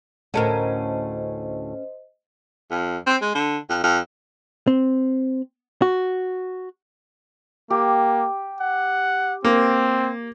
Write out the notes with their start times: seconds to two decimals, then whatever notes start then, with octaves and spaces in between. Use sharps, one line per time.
0.34 D2 A2 C#4 A4 A#4 C5 D#5
2.71 F2
3.07 C4
3.22 G#3
3.35 D3
3.70 F2
3.84 F2
4.67 C4
5.82 F#4
7.70 A#3 G4
8.60 F#5
9.45 A#3 C4